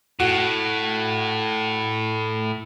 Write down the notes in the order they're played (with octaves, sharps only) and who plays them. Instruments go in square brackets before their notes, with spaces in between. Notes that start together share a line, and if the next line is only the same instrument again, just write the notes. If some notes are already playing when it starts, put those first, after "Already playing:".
[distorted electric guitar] A2 [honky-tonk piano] F#4